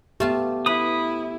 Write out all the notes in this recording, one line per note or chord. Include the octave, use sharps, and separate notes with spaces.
A3 B3 F4 G4 A5
E4 B4 B5 D#6